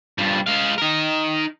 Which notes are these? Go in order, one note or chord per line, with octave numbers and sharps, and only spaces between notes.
G2 F3
G#3 F5
D#4 A#4